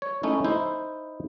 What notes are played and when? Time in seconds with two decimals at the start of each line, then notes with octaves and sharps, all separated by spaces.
0.02 C#5
0.23 A3 C#4 D#4 E4
0.44 D#4 E4 C5